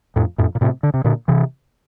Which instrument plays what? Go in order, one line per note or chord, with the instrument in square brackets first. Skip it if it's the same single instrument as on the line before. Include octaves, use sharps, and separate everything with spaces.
[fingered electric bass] F2 A2
F2 A2
A#2
A2 C3
D3
C3
A#2 D3
C3 E3